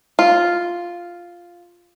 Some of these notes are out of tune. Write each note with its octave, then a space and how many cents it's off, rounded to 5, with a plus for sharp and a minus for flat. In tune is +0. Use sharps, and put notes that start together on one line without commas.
F4 +0